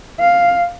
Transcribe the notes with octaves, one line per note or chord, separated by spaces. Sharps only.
F5